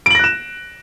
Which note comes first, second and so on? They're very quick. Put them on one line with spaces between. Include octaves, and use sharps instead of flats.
D7 F#7 A#6 F#6 E7